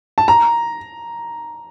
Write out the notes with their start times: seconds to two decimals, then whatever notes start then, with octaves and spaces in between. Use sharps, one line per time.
0.18 A5
0.28 A#5